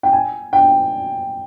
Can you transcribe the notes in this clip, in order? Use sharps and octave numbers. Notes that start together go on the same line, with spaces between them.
G5
G#5
G5